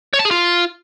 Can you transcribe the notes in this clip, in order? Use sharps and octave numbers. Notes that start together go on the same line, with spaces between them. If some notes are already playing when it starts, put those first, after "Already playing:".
C#5
A5
G#4
F4